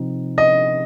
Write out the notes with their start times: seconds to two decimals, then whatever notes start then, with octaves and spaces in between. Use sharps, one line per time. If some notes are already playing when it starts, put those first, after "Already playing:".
Already playing: C3 F3 C4 D#4
0.38 D#5